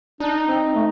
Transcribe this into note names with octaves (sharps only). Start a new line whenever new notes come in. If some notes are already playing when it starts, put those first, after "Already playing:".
D4 D#4
C4
A3